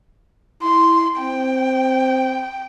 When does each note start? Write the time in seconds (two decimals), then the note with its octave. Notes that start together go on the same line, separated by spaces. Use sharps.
0.63 E4 C6
1.18 C4 G5